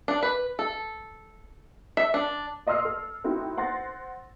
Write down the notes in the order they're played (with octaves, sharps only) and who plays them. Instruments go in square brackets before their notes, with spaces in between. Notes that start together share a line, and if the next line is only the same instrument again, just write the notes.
[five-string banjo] D4
B4
A4
E5
D4
[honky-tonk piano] D5 D#5 C6 E6 F6 C7
A4
A3 C4 D#4 E4 F#4
C5 F#5 C6 A6 A#6